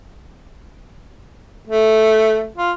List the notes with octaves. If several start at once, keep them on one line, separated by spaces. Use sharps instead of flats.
A3
F4